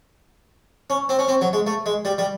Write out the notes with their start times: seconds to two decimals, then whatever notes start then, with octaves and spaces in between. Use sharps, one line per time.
0.90 C#4
1.09 C4
1.19 C#4
1.28 C4
1.41 F#3
1.53 G#3
1.67 A3
1.86 G#3
2.05 G3
2.18 G3